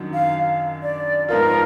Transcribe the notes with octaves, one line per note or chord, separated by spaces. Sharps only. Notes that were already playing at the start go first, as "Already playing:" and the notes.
Already playing: F#2 D#3 F#3 D4
F5
D5
G#2 F3 B3 F4 A#4